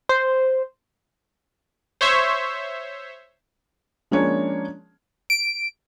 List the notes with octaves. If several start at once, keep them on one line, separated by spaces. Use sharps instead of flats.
C5
C5 C#5 E5
F3 G#3 A#3 C#4 D4 C#5
D7